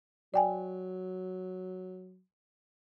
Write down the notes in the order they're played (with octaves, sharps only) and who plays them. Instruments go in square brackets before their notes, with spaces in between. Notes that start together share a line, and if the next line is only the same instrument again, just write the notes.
[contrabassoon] F#3 [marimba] D5 G5 G#5